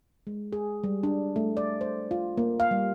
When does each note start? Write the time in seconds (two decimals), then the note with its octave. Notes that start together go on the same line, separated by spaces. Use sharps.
0.27 G#3
0.53 G#4
0.84 G3
1.03 D4
1.36 A3
1.57 D5
1.81 C5
2.11 F4
2.37 A#3
2.60 F5
2.71 G3